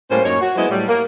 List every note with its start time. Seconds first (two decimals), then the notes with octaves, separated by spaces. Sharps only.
0.10 A2 G3 A#3 C#4 C5
0.25 F#2 A#3 D#4 C#5
0.41 F#4
0.56 F#3 G#3 B3 E4 C5 D#5
0.70 A2 F#3 G3
0.88 A#3